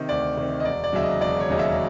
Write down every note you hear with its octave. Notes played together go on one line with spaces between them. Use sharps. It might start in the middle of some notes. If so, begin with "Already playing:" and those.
Already playing: C3 D#3
D2 D5
C3 D#3
D#5
E1 D5
D5
D#2 C#3 F#3 E5
D#5
E1 D5
C#5
D#2 C#3 F#3 D#5
E5